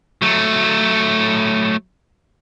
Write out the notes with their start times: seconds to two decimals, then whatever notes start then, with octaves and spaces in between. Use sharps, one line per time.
0.22 F#3 A3